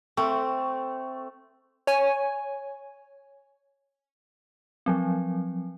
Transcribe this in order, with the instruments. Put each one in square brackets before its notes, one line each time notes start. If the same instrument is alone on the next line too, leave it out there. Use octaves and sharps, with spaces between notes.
[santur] A3 [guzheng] C4
[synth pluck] C#5 G#5
[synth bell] F3 F#3 C4